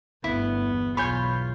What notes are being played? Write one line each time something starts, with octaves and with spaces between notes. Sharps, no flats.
G1 D2 B3 E4
E2
B1 E2 F4 C#5 G#5 B5 G6